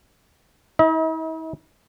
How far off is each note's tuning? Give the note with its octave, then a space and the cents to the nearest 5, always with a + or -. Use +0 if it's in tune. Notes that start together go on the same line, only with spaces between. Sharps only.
E4 -45 D#5 +45